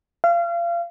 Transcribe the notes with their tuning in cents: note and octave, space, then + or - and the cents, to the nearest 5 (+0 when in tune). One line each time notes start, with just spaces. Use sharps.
F5 -30